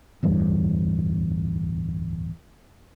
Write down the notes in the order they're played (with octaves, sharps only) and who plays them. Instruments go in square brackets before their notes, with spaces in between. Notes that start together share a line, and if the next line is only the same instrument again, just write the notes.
[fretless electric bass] D1 E2 G2